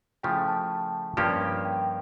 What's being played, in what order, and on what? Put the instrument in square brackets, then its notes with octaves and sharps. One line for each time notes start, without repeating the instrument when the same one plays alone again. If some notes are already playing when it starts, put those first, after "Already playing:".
[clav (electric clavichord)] C#3 F3 A3 E4 G4 [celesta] G5
[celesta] A5
A5
[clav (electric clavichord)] G2 F3 A#3 C#4 G4
[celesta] G5